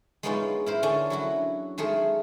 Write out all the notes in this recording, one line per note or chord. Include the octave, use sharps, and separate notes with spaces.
G#3 A#3 B3 C#4 D#4 F4
E4 A#4 C5
D3 C#4 D4
F#3 E4 F#4
D#3 G#3 A3 G#4 A#4